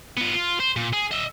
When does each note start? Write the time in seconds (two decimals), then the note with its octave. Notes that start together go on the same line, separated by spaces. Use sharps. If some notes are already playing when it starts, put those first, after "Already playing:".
0.17 B3 F4
0.35 F4
0.60 C5
0.76 A#2
0.93 G#4
1.11 D#5 E5